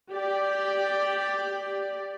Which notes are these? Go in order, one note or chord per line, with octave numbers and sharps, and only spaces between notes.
G4 D5